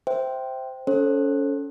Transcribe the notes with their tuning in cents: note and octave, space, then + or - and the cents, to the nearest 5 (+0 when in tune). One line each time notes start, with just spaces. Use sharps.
C5 +0 E5 +0 G5 -10
C#4 +25 A4 +0 C5 +35